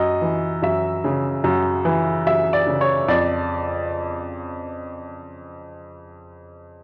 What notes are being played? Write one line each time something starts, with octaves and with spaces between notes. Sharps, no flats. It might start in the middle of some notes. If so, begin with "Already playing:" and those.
Already playing: F#2 D#5
E3
F#2 E5
C#3
F#2
E3
F#2 E5
D5
C#3
C#5
F2 D5